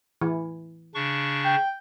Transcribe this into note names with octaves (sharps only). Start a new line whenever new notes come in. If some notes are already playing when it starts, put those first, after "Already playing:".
E3
C#3 D4 C#6
G5